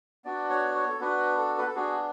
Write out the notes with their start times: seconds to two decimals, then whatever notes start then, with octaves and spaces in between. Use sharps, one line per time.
0.25 B3 D4 F#4 D5
0.50 C#5
0.75 C#5
0.89 A4
1.00 B3 D4 F#4 B4
1.38 A4
1.58 B4
1.66 A4
1.75 B3 D4 F#4 G#4